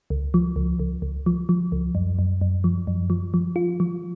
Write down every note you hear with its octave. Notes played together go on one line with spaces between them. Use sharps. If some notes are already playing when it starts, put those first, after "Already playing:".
C#2
F3
C#2
C#2
C#2
F3
F3
C#2
F#2
F#2
F#2
F3
F#2
F3
F3
F4
F3